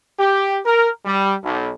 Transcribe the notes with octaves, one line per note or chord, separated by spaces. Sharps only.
G4
A#4
G3
B1